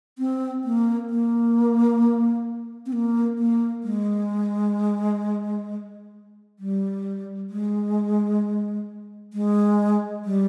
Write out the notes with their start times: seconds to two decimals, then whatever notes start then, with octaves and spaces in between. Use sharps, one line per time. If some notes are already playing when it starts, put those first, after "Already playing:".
0.18 C4
0.64 A#3
1.10 A#3
2.86 C4
2.93 A#3
3.39 A#3
3.84 G#3
6.59 G3
7.50 G#3
9.33 G#3
10.25 G3